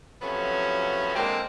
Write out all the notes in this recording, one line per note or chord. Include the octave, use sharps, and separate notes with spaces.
C3 F3 F#3 A3 B3 C#4
D3 G#3 A#3 C4